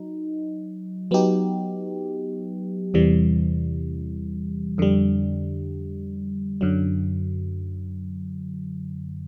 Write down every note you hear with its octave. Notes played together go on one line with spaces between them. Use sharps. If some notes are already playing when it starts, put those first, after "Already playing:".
Already playing: F#3 D#4
F#3 B3 D#4 G4
E2 C3 E3 G3
F2 D3 G3
F#2 D3 F#3